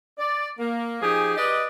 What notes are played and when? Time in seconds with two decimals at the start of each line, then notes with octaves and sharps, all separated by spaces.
0.18 D5
0.58 A#3
1.01 F3 D#4 G4 G#4 G#5
1.35 G4 B4 D5 D#5